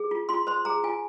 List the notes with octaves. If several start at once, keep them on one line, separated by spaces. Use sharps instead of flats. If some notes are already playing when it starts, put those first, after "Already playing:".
Already playing: G#4
F4
F4 C6
C5 C6
G#4 A#5
F4 G#5